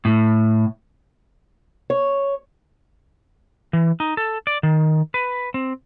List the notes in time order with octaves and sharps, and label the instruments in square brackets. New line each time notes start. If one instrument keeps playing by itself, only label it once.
[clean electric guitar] A2
[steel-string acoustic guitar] C#5
[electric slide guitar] E3
D#4
A4
D5
D#3
B4
C4